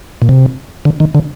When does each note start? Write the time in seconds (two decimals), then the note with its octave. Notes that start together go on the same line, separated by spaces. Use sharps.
0.22 A#2
0.29 C3
0.85 D3
1.00 D#3
1.15 D3